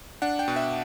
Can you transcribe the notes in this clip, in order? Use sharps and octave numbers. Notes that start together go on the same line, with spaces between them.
D4 F#5
G5
B2
E5